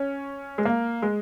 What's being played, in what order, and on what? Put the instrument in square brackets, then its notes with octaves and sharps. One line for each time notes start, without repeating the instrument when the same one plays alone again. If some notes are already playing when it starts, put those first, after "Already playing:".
Already playing: [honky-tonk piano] C#4
G#3
A#3
G#3